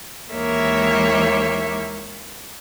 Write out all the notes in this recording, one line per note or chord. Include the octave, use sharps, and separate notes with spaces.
D#2 E3 G#3 A#3 C#5 E5